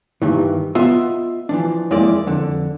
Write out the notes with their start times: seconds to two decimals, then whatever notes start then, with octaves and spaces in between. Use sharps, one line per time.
0.22 G2 D#3 E3
0.75 B3 F4 D#5 E5
1.49 E3 F3 D4
1.91 F2 G#3 A#3 E4 D5
2.27 F2 D3